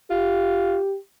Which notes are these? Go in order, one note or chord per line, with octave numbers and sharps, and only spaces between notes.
F4 G4